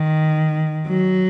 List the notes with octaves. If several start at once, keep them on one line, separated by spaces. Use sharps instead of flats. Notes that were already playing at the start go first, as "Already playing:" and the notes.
Already playing: D#3
F#3